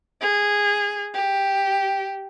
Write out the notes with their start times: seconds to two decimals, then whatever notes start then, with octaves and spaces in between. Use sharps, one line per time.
0.21 G#4
1.14 G4